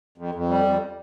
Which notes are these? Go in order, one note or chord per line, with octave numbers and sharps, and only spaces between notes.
F2
F2
G3
F2